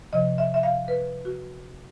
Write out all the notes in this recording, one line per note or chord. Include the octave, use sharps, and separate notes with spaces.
C3 F3 D#5
E5
E5
F5
B4
F#4